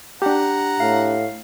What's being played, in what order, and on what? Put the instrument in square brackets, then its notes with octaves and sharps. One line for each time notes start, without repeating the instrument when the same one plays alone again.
[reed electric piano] D4 G4 [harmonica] F#5 A#5
[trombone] A2 [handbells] F5